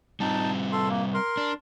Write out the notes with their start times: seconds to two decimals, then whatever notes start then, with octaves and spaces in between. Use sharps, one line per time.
0.20 G3 C4 D#4 F4 A5
0.72 A4 C6
0.89 A#3
1.14 A#4 C6
1.37 D4